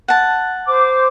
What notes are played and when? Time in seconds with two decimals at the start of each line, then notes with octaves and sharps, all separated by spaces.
0.08 F#5 A5
0.66 C5 D6